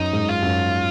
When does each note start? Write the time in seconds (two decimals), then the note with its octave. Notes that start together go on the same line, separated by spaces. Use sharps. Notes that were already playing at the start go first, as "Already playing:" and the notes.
Already playing: F#2 D#4
0.13 G#2
0.28 F4
0.43 F#2